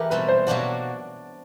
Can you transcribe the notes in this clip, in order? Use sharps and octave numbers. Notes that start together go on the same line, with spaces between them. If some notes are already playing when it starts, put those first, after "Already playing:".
Already playing: E3 A3 E4 G4 A#4 B4
B2 G3 C4 B4
C5
B2 F#3 A#3 D4 F#4 D5